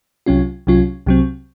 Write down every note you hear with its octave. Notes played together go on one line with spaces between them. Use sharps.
C2 C3 F#3 C#4 F4
C2 C3 F#3 C#4 F4
C2 C3 F#3 C4